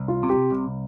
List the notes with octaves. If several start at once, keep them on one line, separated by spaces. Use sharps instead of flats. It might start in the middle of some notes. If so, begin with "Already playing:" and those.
Already playing: C2
F4
C3
G4
C2